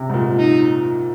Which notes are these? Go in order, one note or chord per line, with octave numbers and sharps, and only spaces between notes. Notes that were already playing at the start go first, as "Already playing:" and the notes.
Already playing: C3
G#2
A#2
D#4